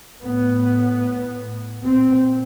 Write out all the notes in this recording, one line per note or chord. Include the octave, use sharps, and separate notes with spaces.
A2 B3
A#2 C4